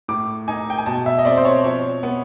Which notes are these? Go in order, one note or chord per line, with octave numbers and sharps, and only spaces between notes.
A2 D6
D#4 G#5
G5
G#5
B2 A5
E5
D#5
C4 D5
C5
C#5
F3 C#5
B3